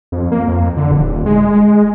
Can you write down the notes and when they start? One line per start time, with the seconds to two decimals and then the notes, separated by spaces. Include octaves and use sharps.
0.12 F2
0.31 A#3
0.48 F2
0.77 D3
0.91 D#1
1.26 G#3